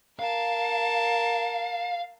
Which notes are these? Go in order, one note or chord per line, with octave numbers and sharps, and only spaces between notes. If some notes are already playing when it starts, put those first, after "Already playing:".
A#4 F5 A5